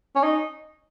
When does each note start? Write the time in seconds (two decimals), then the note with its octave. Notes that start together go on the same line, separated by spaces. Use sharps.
0.16 C#4
0.23 D#4